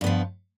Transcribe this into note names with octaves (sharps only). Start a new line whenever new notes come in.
G2 F3 B3